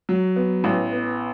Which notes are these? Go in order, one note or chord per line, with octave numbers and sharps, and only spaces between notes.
F#3
B3
A1
B3